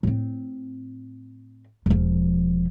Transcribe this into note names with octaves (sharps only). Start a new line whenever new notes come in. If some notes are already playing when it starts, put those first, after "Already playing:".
A2 C4
E1 F3